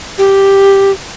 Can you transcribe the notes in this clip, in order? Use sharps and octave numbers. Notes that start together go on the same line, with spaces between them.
G4